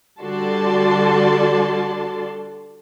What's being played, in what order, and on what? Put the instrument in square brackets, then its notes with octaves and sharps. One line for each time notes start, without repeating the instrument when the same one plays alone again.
[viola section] D3 G3 F#4 D5 A5 C6